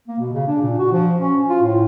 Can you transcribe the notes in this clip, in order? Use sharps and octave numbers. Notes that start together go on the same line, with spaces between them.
A#3
B2
C#3
D4
A#2
F#4
F3
C#4
F4
A2